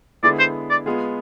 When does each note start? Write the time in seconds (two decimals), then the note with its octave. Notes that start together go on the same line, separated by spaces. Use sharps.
0.23 D3 G#3 B3 E4 G#4 D5
0.39 C5
0.70 D5
0.86 G#3 B3 F4 G#4